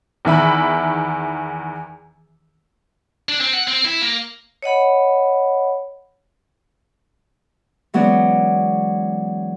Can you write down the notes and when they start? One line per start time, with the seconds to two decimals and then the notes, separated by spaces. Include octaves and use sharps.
0.25 E2 D#3 E5 B5
3.29 D4
3.41 C4
3.53 F#5
3.68 C4
3.85 E4
4.02 A#3
4.62 C#5 D#5 F#5 B5
7.94 E3 F#3 G#3 B3 C#4 D5